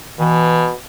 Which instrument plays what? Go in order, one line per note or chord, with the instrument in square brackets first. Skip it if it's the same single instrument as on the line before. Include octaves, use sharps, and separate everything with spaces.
[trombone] B2 [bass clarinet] E3